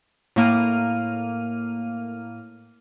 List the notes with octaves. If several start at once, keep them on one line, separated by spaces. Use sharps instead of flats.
A2 A#3 F6 D#7